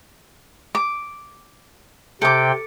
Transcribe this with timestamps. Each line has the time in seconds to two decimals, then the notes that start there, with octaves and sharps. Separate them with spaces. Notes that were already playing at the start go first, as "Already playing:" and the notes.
0.75 D6
2.22 C3 A4 G5 D6